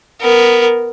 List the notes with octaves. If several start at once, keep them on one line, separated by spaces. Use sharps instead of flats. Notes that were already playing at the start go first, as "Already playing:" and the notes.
B3 A#4